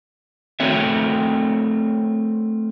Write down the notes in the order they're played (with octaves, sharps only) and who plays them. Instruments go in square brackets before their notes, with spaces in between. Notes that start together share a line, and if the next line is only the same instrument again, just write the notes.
[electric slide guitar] A3 C4 A#4 C#5 E5